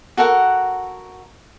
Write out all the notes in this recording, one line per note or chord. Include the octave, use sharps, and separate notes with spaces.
F#4 A4 A#4 F#5